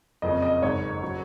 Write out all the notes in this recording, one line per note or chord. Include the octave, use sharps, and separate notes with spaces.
F#1 F2 C#3 D#5
D#5
G#1 F#2 C#3 C#5
C#3 F#3